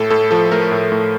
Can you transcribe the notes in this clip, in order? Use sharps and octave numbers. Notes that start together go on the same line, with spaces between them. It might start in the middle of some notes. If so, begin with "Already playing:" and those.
Already playing: A2 A4
A2 A4
F3 A4
A3 A#4
A2
A2